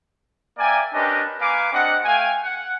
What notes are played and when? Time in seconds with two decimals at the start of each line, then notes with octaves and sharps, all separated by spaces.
0.58 A#3 D5 E5 G5 G#5
0.94 C#4 D4 G4 A#4 B4 D#5
1.40 A#3 B4 F5 G#5 D6
1.72 C4 D4 G4 D#5 F#5
2.05 A3 F5 G5 G#5
2.44 F#5